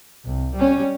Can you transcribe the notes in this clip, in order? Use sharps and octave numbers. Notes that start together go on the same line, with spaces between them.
C2
G3 C#4